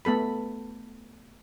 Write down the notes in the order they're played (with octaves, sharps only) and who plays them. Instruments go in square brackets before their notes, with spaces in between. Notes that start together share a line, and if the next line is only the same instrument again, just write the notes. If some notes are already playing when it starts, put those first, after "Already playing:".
[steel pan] A3 B3 A4 B5